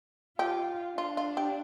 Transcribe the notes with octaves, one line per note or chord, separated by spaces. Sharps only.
F4 G4
D4 F4
F4
G4